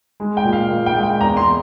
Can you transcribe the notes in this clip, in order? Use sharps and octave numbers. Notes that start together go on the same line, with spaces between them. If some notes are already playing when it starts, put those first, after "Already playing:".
G#3
G5
A#2
F5
A#2
G5
G#3
G5
E2 A#5
C6